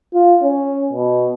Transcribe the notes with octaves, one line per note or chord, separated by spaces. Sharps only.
F4
C#4
B2